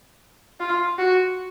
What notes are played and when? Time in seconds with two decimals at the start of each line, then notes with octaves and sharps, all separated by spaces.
0.60 F4
0.98 F#4